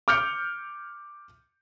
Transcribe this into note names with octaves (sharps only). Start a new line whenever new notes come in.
D6 F6 G6 C#7